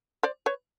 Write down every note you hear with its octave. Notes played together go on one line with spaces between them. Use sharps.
C5 D5
B4 C#5